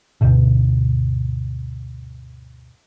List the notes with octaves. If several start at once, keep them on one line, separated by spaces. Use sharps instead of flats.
D2 G2 B2 D3